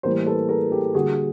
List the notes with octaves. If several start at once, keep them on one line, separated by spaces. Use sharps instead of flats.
A2 E3 G3 A#3 A#4 C5
A4 B4
G#4 A#4
G4 A4
D3 G3 A#3 F#4 G#4